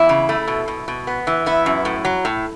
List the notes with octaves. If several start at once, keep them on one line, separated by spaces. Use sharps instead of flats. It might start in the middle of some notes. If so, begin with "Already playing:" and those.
Already playing: E2 E4
C#3
A3
B2
B2
B2
B3
E3
B3 E4
F#2
A2
F#3
A2